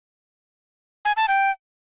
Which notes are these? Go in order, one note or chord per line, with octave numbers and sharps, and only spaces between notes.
G#5
A5
G5